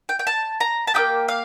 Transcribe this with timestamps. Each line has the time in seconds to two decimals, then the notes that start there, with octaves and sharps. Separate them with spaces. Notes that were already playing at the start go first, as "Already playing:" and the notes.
0.09 G5
0.19 G5
0.27 A5
0.60 A#5
0.87 A5
0.94 A#3 D#4 G4 G5
1.28 F5